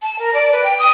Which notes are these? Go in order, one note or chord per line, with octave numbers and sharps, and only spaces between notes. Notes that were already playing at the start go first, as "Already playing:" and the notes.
A5
A#4
D5
B4
G5
D#6